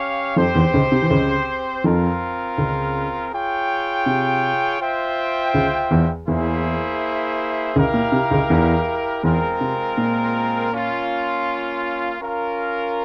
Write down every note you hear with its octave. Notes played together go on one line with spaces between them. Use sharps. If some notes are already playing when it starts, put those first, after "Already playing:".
Already playing: C#4 G4 C#5 F5
F2 F3 C4 G4 C5
E2 E3
C#2 C#3
C3
E3
C#2 C#3
F2 F3 C4 F4 A#4
C#2 C#3
F4 G#4 C#5 G5
C3
F4 C5 E5 G5
C#2 C#3
E2 E3
E2 E3 A#3 E4 G#4 C5 E5
C#2 C#3 E4 G4 A#4 F5
A#2
C3
C#2 C#3
E2 E3
E2 E3 G#3 C4 F4 A#4
C3
A#2
A#3 C#4 F4
C#4 F4 A#4 F5